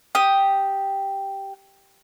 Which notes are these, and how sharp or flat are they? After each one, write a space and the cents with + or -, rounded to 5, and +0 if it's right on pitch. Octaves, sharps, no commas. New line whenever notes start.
G4 +0 D#6 +0